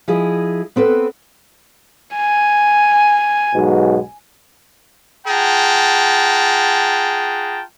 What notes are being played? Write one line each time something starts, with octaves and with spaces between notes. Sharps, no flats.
F3 E4 G#4 D#5
B3 C4 A4 B4
G#5
B1 G#2 B2
F4 G#4 F#5 G5 A5 A#5